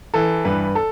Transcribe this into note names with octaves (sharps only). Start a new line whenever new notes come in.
E3 A4
G2 B4
A4